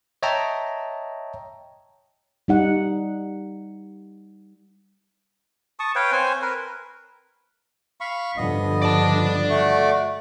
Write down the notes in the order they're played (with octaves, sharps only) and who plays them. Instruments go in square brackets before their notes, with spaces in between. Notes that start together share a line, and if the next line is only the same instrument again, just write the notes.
[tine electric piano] C#5 D#5 E5 G5 A5 A#5
[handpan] G3 D#4 F#5
[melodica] A5 C#6 D#6
B4 C#5 F5 G5
C4 C5 C#5 G#5
A#4 B4
F5 B5 C#6
[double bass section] G2 D3 F3 [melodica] B3 D#5
[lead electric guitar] D5 A5
[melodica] A3 F#4